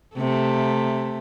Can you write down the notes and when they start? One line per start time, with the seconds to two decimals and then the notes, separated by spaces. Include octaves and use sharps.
0.16 C3 A3